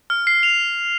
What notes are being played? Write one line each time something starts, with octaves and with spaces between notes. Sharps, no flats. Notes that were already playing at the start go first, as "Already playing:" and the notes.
F6
C7
F7